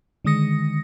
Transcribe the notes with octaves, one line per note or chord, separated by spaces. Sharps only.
D3 D#3 G#3 D#6 A#6 C#7